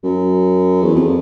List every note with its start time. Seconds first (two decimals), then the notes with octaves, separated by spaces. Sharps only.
0.03 F#2
0.82 E2
0.95 F2